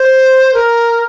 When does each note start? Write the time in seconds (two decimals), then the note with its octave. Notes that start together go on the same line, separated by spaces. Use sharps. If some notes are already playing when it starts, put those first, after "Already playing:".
Already playing: C5
0.54 A#4